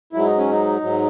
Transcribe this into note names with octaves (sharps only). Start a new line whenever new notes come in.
G#2 F#3 E4
D#4
C#4
D#4
G#2 F#3